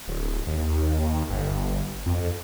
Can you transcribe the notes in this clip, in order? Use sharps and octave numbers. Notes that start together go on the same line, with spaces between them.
D1
D#2
G1
F2